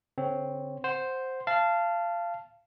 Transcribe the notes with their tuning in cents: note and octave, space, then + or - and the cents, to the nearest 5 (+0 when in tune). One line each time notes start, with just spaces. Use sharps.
D3 -45 C4 +0 C#5 +0
C5 +0 F#5 +0
F5 -20 A5 +0